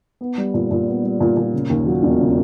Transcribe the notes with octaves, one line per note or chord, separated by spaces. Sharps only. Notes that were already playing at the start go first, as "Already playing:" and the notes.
B3
G3
A#2
A#2
B3
G3
A#2
A#2
C#3
D#2
F#3
E1
C#3